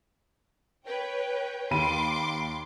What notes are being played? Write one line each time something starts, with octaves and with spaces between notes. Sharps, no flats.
B4 C#5 G5
D#2 B5 C6 D6 D#7